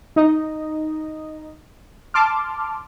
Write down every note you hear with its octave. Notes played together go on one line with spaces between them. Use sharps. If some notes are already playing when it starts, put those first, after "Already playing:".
D#4 D#5
A5 C6 D6 F6